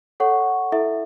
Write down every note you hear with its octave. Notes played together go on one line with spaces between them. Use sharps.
A4 C#5 F#5 C#6
E4 A4 E5